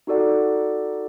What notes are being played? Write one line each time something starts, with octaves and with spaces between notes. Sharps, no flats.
D#4 F#4 A4 D5 F#5